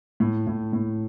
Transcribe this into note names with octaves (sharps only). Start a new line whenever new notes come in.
A2
A2
A2